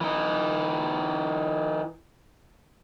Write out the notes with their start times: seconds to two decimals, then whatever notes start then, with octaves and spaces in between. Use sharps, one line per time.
0.01 E3 D#4